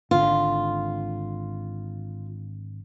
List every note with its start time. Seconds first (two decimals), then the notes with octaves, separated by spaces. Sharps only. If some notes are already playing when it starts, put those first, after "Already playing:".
0.11 G#1 D3 F4